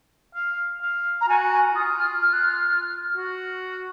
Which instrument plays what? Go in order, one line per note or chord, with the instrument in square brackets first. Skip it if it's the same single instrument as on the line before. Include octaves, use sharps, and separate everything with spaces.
[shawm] F5
F5
[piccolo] A#5
[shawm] F#4 [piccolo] G#5
[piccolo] G#5
[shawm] F4 [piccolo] D#6
[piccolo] F6
F6
F#6
F6
[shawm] F#4